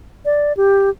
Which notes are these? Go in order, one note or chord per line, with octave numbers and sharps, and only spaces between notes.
D5
G4